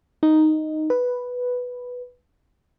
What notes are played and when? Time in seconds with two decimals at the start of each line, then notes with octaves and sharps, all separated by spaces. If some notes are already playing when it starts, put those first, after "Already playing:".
0.23 D#4
0.90 B4